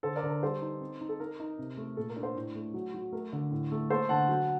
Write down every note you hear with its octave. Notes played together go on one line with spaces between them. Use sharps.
D3 A4 C5
A#4 D5
D3
A#4
G3 A4 C5
D#4
C4
D#4
A4
D#4 A#4
D#4
C3
A3
A#2 A4
A#4
D4
A4 C5
A2
A3
F#3
F#3
A3 A#4
D3
A2
A3
A#3 A4 C5
D3 F#5 A5
F#3